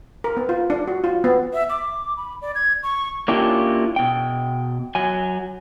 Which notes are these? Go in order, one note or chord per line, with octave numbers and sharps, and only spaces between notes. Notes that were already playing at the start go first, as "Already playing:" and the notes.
A#4
B3
F4
D4
F#4
F4
B3
E5
D6
B5
D5
G#6
C#6
A#3 C#4 D4 E4 F4 G4
B2 G5
F#3 G#5